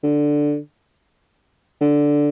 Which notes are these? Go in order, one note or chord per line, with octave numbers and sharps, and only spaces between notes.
D3
D3